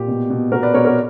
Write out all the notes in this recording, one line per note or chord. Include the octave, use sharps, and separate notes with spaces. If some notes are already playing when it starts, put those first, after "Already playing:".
Already playing: A#2 G4
B2
B2
B2 F#4 A#4
B4 D5
B2 A#4 C#5
F#4 A#4